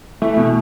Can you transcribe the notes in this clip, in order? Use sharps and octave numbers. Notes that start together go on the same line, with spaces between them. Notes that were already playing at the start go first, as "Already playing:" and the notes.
E3 A3
B2